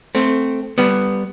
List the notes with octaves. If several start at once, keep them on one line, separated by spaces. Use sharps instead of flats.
A3 C4
G3 B3